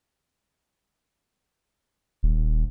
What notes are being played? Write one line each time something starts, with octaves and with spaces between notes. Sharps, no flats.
D#1